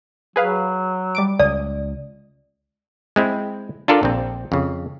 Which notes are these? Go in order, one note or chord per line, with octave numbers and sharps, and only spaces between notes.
F#3 G#4 B4 F5
G3 D6 D7
C#2 D5 D#6
G#3 C4 E4
D4 F4 A4 A#4 D5
A#1 C4
F2 C#3